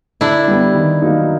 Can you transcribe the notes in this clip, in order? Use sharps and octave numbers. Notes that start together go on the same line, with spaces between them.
D3 D4 E4
G3 B3
D#3
F#3 A#3 D#4